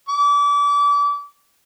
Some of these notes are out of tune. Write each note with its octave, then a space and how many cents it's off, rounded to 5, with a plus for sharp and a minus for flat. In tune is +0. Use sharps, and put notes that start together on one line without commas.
D6 -30